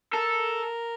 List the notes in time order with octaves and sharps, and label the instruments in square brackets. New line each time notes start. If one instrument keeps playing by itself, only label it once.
[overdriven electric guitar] A4 [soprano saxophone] A#4